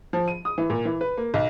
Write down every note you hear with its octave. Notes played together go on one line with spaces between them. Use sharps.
F3
D#7
D#6
E3
A#2
E3
B4
A#3
B1